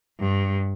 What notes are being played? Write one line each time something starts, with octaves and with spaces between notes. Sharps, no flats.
G2